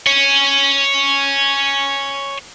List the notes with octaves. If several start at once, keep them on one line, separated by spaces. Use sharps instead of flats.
C#5 G#5